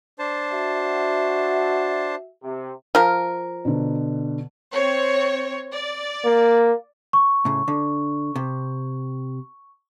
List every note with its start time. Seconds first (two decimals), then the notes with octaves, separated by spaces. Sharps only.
0.19 D4 C5 A5
0.51 F#4 E5
2.43 C3
2.95 F3 A#4
3.65 B2 D3
4.73 C4 C#5
5.75 D5
6.25 A#3
7.13 C#6
7.45 A2 C#3
7.68 D3
8.36 C3